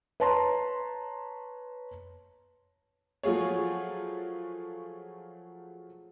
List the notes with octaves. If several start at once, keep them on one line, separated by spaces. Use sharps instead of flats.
B4 C#5 A5 A#5 C6
F3 F#3 A3 F4 G#4 C#5